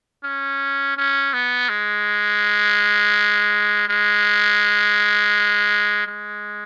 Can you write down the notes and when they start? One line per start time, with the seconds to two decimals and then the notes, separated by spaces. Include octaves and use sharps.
0.24 C#4
0.97 C#4
1.33 B3
1.69 G#3
3.88 G#3
6.07 G#3